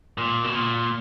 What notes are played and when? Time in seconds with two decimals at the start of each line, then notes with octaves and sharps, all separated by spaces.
0.18 A#2
0.44 B2
0.55 A#2